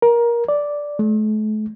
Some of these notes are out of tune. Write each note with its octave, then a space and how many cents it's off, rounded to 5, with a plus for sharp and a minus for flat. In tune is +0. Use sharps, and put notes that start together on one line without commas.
A#4 +20
D5 -5
A3 -40